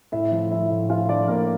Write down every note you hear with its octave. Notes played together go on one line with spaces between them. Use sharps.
A2 E4 E5
F3
F3 E4 E5
A2
F3 F4 F5
F3 D4 D5
A2 A#3 A#4